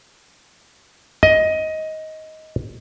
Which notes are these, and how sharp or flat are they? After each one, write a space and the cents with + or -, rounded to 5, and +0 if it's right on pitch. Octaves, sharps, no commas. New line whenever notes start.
D#5 +15